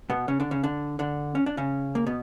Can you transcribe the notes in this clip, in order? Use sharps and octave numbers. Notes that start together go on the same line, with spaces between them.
B2 B3
C#3 C#4
D3 D4
C#3 C#4
D3 D4
D3 D4
C#4
D4
C#3 C#4
A#3
B2 B3